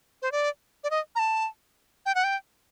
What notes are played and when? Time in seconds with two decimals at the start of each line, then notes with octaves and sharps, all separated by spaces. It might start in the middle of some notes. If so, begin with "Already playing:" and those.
0.22 C5
0.32 D5
0.84 D5
0.91 D#5
1.16 A#5
1.19 A5
2.06 G5
2.15 F#5
2.24 G5